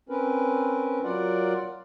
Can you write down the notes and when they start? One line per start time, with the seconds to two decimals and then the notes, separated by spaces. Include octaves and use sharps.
0.09 C4 C#4 A#4 B4
1.04 F#3 F4 A#4 D5 F#5